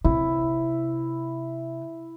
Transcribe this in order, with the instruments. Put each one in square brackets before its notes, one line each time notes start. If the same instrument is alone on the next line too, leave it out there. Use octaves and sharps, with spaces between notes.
[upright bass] C3 [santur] E4